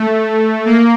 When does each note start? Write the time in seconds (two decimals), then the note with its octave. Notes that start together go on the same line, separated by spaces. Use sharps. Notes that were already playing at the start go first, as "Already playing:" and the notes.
Already playing: A3
0.66 A#3